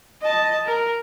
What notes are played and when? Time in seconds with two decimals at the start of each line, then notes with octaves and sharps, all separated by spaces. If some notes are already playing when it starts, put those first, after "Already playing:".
0.21 D#5 A5
0.66 A#4